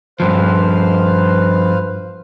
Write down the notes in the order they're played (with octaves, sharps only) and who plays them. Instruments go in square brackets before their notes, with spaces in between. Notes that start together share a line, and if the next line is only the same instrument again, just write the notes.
[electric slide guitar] G2 F3 [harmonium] B4 C5 F5